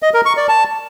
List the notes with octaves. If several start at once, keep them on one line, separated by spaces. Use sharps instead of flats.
D#5
A#4
C#6
D5
A5